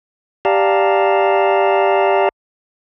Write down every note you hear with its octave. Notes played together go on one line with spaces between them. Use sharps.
G4 D5 F5 A5 A#5